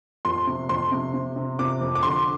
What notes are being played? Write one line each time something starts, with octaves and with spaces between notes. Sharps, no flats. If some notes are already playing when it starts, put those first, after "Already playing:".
F2 C6
C3
F2 C6
C3
C3
C3
C3 D6
F2
D6
D3 C6